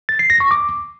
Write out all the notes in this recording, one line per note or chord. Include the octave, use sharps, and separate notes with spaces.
A6
C7
A#6
C#6
D6